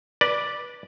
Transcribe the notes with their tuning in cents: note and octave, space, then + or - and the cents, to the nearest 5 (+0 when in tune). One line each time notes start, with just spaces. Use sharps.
B4 -20 D5 +0